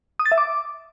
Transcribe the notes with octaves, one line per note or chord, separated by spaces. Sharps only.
D#6
A6
E5
D6